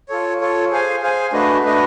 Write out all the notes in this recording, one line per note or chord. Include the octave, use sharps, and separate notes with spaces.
F4 A4 C#5
F4 A4 C#5
G#4 C5 F5 G#5
G#4 C5 F5 G#5
A3 D4 F#4 B4 D#5
A3 D4 F#4 B4 D#5